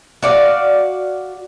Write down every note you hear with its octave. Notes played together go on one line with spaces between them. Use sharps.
F#4 D5 F5